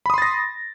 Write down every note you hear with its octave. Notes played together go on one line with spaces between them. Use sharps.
B5 C6 D#6 A6 A#6